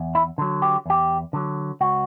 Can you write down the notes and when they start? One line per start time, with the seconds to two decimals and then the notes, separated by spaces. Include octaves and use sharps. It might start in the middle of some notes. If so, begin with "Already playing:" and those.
Already playing: E2
0.15 E4
0.38 D3 F#3
0.62 G4
0.86 E2 G4
1.33 D3 F#3
1.81 C#2 F#4